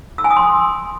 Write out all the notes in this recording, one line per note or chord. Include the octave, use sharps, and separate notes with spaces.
E6
G#5
D#6
C6